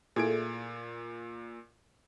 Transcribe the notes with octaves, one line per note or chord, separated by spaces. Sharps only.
A#2 A3 E4 G#4 G#6 D7